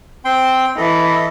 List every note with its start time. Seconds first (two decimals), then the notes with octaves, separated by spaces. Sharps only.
0.25 C4 G5 C6
0.77 E3 A4 D#5